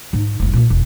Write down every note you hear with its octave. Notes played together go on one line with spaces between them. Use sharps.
G#2 D#4
F1 C2
A#2 A#3
E1 A#1